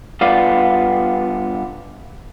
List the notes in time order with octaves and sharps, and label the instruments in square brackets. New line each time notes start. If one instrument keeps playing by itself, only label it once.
[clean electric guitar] G2 B3 F4 D5